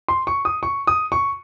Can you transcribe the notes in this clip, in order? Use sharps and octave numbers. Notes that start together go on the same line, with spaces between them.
C6
C#6
D#6
C#6
D#6
C#6